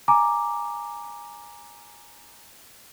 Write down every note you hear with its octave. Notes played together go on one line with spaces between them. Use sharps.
G#5 A#5 D6